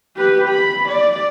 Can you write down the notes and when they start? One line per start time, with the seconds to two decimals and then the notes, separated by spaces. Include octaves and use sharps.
0.17 G4 B4
0.49 B5
0.88 D5